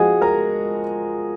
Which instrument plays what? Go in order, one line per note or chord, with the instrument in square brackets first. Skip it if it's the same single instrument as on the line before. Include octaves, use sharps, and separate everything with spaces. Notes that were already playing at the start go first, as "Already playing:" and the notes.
Already playing: [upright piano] F3 G#3 [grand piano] F#4 G#4 F#5 G#5
[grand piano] A#4 A#5